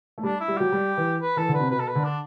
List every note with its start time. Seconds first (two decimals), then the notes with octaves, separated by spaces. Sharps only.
0.18 A3
0.23 G3 D4
0.40 E4
0.48 G3
0.57 F#3 G4
0.72 G3
0.97 E3
1.22 B4
1.36 E3 A4
1.48 D3
1.54 B4
1.60 C3
1.70 B2 B4
1.80 A4
1.88 B4
1.95 D3
2.04 D4